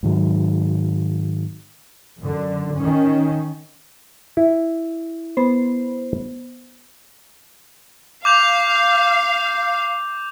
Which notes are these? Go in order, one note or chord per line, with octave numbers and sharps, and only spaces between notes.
G#2 D#3 F#3
F#2 D3
D#3 C#4
E4
B3 C5
F5 D6 G6 F7